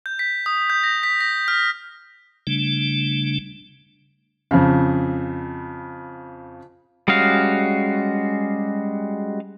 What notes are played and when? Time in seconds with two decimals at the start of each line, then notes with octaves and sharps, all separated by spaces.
0.06 G6
0.19 B6
0.46 D#6
0.70 G6
0.84 A#6
1.03 B6
1.21 A#6
1.48 F6
2.47 C#3 G3 A3 D4
4.51 F2 C#3
7.08 G3 G#3 C#4 F#4 F5